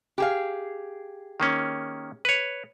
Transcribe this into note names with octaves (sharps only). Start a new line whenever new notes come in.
G4 G#4 F5
D#3 A#3 C#4
B4 C#5